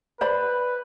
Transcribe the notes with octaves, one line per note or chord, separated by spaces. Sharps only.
B4 C5 D5 B5